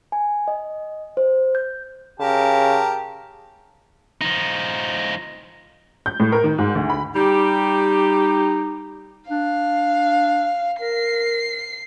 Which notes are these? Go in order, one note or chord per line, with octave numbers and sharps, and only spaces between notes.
G#5
D#5
C5
G6
C#3 G4 A#4 A5
F3 D#4
G6
A2
A#4
D#3
G#2
D2
B5
G3 D#4 G4
D4 F5
A#4 C7